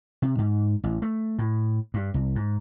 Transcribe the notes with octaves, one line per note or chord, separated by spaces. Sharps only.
C3
G#2
A1
A3
A2
G2
C2
G#2